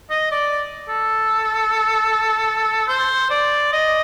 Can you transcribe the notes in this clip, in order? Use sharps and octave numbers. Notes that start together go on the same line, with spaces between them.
D#5
D5
A4
C5
D5
D#5